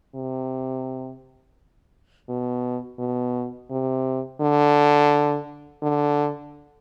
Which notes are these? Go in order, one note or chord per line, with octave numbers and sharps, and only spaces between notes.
C3
B2
B2
C3
D3
D3